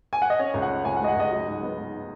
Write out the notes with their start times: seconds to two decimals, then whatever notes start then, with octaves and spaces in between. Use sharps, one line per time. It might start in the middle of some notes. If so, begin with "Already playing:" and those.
0.13 G#5
0.22 F#5
0.30 D#5
0.39 C#4 C#5
0.54 C#2
0.62 F#5
0.69 C#4
0.85 C#2 G#5
0.96 F#5
1.00 G#3 D#5
1.08 F#5
1.16 C#2 D#5
1.31 F#3
1.47 G#2
1.62 B3
1.78 G#2